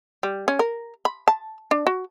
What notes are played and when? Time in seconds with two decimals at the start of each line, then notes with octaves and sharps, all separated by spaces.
0.23 G3
0.48 C#4
0.59 A#4
1.05 B5
1.28 A5
1.71 D4
1.87 F#4